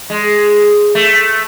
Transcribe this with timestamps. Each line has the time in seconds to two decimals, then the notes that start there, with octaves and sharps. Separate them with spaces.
0.10 G#3
0.95 A3